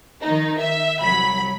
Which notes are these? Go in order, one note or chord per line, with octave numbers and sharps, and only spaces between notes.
D#3 D#4
E5
C2 F#3 B5 B6